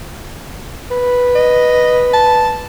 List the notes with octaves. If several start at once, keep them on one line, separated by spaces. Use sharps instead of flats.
B4
D#5
A5